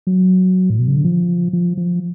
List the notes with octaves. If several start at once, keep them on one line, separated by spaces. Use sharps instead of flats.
F#3
A2
B2
C#3
D3
F3
F3
F3